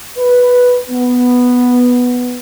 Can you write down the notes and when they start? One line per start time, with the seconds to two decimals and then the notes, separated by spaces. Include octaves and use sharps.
0.18 B4
0.90 B3